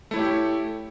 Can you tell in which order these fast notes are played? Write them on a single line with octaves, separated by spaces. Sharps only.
A3 E4 C#5 G4